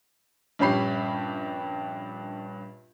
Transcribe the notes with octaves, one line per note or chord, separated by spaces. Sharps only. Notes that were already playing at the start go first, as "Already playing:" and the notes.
A#1 G2 C#4 G4 B5 C7